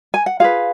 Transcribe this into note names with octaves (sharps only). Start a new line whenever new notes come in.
G#5
F#5
F4 G#4 B4 F5